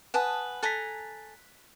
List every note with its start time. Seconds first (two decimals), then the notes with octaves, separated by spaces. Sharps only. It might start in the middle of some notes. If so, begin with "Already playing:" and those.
0.14 B4 F#5 G#5 A5 D#6
0.63 A4 G#5 A#5 F#6 B6